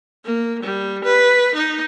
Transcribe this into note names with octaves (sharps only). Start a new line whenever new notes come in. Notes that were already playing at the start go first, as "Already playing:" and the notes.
A#3
G3
B4
D#4